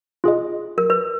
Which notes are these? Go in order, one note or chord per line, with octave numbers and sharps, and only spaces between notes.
F4 G#4 D#5
A#4
B4